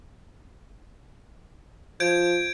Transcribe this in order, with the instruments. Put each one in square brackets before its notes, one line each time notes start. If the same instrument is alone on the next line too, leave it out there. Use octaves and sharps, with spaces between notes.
[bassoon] F3 [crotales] G6 G#6 D7